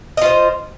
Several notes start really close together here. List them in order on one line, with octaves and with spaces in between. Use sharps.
D#5 F4 C5